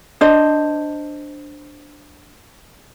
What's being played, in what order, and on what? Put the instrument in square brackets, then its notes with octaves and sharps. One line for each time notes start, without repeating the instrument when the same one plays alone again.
[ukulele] D4 C5 D#5